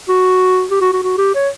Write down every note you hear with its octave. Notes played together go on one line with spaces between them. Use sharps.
F#4
G4
F#4
F#4
F#4
G4
C#5